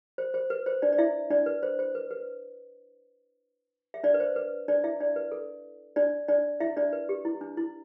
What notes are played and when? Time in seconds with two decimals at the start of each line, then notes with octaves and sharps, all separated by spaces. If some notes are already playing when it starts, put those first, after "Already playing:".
0.18 C5
0.34 C5
0.50 B4
0.66 C5
0.82 D4 D5
0.92 D5
0.98 E4 E5
1.30 D4 D5
1.46 B4
1.63 C5
1.79 C5
1.95 B4
2.11 B4
3.94 E5
4.04 D4 D5
4.14 B4
4.20 C5
4.36 B4
4.68 D4 D5
4.84 E4 E5
5.00 D4 D5
5.16 B4
5.32 A4
5.96 D4 D5
6.28 D4 D5
6.60 E4 E5
6.77 D4 D5
6.93 B4
7.09 G4
7.25 E4
7.41 D4
7.57 E4